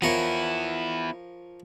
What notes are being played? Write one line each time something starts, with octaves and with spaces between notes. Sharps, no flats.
F3 B3 E4 A#4 C#5